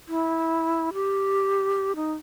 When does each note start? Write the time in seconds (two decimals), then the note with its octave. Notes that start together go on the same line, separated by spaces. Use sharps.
0.08 E4
0.93 G4
1.96 D#4